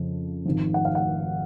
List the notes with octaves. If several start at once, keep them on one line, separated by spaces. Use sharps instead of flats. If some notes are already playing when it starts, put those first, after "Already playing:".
Already playing: F2 C#3 F3
G#1 G#2 F3
F#5
F5
F#5